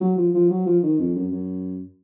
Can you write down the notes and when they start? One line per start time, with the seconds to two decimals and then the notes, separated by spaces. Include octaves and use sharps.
0.01 F#3
0.17 F3
0.34 F3
0.50 F#3
0.67 F3
0.83 D#3
0.99 F2
1.15 F#2
1.32 F#2